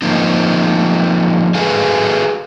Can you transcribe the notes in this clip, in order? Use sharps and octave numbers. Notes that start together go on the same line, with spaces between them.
F3 A#3 C4 D#4
F#4 G#4 A4 B4 F5 G#5